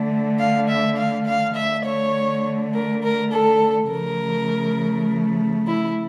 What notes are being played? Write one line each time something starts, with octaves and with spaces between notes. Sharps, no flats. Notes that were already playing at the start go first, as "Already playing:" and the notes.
Already playing: D3 A3
F5
E5
F5
F5
D3 A3 E5
C#5
A#4
A#4
A4
C#3 F3 A3 A#4
E4